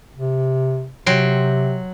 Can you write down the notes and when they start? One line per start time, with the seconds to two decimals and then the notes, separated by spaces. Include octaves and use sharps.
0.15 C3
1.06 C3 F#3 G5 C6